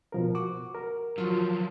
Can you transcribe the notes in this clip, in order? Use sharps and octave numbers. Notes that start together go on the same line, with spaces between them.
B2 F3 A#4
F#4 D6
A#4
F3 F#3 F4 F#4